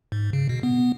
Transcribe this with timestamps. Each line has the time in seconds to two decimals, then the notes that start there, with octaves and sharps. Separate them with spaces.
0.12 G#2
0.33 C#3
0.49 B2
0.63 B3